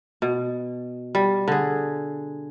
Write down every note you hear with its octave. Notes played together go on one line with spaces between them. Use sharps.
B2
G3
D3 G#4